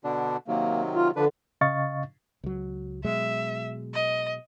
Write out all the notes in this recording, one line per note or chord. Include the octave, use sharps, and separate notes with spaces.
B2 D3 D4
C3 D#3 F#3 A#3
F4
D3 F3 D4 B4
C#3 D#5 F5 C#6 A6
C#2 F#3
B2 F#3 G#3 E5
D#5